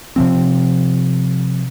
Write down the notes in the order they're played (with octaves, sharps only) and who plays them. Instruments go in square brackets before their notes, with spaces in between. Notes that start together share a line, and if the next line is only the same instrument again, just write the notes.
[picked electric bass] C3 F3 C4